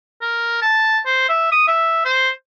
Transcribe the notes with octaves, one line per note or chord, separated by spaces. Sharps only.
A#4
A5
C5
E5
D#6
E5
C5